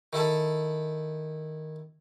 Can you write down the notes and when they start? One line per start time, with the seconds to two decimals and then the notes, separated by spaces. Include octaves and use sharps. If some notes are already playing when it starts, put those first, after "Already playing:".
0.13 D#3 E4 A4 A5